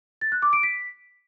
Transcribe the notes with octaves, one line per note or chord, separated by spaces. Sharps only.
A6
F#6
D6
D7
B6